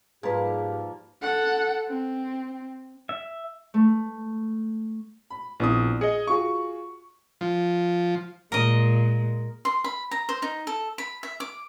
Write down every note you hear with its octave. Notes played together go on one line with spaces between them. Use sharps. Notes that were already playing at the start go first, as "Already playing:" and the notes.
G#2 F3 G3 A#3 G4 G#4 B4
A4 F#5
C4
E5
A3
B5
A#1 B3 C4 E4 D#6
G#4 D#5 C#7
F4 F#4 G#4 C#6
F3
A#2 G#3 A#4 D#5
C6
B5
A#5
C5
D#4
A4
B5
E5
D6